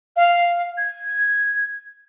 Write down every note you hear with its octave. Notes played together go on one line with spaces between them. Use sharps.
F5
G#6